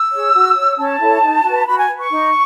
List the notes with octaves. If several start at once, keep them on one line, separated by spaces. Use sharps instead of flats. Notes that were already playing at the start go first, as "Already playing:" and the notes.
Already playing: E6
G#4 C#5
F#4
C#5
C#4 A5
E4 A4 C#5
D#4
F#4 B4
F#4 B5
G#5
B4
C#6
D#4